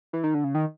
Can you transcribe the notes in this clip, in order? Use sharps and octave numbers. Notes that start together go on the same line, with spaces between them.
E3
D#3
D3
C#3
D#3